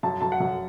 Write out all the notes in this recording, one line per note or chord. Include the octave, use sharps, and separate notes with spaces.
F#2 A5
F#2 A5
F#5
F#2